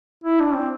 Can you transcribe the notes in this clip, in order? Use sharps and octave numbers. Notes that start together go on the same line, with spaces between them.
E4
D4
C4